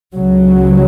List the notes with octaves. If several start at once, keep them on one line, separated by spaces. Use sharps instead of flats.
C#2 C#3 F#3